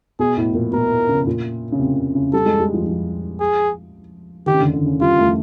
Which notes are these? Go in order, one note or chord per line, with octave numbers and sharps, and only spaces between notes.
B2 G#4
A2
A#2
B2 A#4
C#3
A#2
C#3
C3
C#3
G3 A4
G#3
G3
F3
F3
G#4
D#3 G4
C#3
D3
D3
C#3
G3 F4
A3